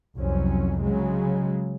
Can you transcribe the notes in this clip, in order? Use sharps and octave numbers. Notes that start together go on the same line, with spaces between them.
C2 F2 F#3 C#4
C#3 F#3 G#3